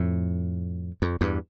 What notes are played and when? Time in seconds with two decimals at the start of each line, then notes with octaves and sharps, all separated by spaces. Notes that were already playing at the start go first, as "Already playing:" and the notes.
Already playing: F2 A2
1.02 F2
1.21 E2 G2